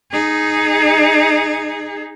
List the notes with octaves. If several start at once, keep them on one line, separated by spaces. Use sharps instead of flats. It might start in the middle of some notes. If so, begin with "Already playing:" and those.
D#4 G#4